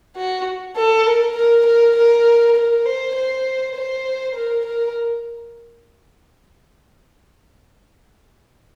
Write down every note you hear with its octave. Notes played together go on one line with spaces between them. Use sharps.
F#4
A4
A#4
A#4
A#4
A#4
A#4
C5
C5
C5
A#4
A#4